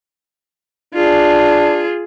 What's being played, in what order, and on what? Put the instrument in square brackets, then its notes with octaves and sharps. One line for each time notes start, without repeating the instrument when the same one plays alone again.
[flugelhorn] D4 [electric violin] F4 G#4